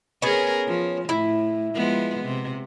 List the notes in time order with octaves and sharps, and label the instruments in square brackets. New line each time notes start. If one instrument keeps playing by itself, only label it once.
[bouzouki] B3 C#4 [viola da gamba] G#4 A#4
[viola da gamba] F3
[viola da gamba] A2 [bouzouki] E4
[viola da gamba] F3 G#3 B3
C3